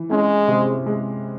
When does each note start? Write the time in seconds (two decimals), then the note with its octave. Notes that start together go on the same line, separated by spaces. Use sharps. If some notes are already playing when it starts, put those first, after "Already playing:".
Already playing: E3
0.10 G#3 C#4
0.48 C3
0.86 G#3